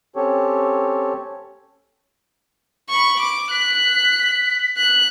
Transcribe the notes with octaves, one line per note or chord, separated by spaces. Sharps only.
C4 C#4 G4 A4 C#5
B5 C#6
D6
F#6 B6
F#6